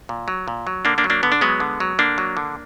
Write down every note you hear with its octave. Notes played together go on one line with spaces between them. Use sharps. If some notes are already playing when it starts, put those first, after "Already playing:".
A#2
F#3
A#2
F#3
D3 A#3 D4
A#3 D4
F#3
A#3 D4
D3 B3
D4
F#3 G#3 B3
D3
F#3
D3 A#3 D4
F#3
D3